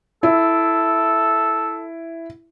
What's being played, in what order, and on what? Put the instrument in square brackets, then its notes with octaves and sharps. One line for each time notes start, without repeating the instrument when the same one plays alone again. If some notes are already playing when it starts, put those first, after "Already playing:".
[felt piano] E4 [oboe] A4